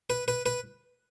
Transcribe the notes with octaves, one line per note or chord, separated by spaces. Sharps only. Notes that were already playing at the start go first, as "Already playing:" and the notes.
B4
B4
B4